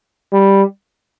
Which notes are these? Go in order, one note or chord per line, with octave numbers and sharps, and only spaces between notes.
G3